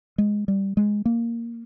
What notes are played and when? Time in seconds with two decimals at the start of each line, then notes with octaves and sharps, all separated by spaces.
0.18 G#3
0.48 G3
0.77 G#3
1.05 A#3